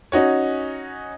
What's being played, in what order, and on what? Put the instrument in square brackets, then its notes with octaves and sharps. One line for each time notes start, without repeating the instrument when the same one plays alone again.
[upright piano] C#4 D#4 F#4 C#5